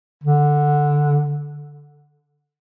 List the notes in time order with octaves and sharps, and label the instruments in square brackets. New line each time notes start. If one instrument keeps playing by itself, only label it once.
[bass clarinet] D3